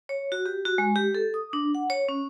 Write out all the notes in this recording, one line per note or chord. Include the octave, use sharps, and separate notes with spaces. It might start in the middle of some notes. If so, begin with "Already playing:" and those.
C#5
F#4
G4
F#4
G#3
G4
A4
D#6
D4
F#5
C#5
C#4